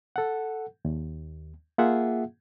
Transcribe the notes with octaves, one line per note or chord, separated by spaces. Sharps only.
A4 F#5
D#2
A#3 F4 G#4 E5 F#5